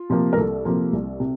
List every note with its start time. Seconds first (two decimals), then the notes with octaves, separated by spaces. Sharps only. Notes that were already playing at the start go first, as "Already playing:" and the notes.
Already playing: F4
0.10 C3 F3 A#3
0.33 A#4
0.37 C2 A4
0.65 C3 F3 A#3
0.93 C2
1.20 C3